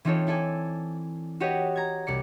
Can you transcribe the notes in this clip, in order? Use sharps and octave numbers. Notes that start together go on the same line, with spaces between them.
E3 C4 D#4 F4 A4 C#5
E4 A4 D5 G#5
F#4 G4 B4 C#5 D#5 F#5
A#5 G#6
C2 G3 D5 C#7